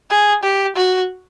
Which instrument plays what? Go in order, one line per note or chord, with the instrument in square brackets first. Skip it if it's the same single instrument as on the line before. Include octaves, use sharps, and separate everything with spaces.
[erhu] G#4
G4
F#4